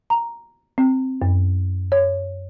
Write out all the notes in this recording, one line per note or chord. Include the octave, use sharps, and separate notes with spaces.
A#5
C4
F#2
C#5